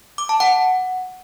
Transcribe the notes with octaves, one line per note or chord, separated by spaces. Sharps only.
D6
A5
F#5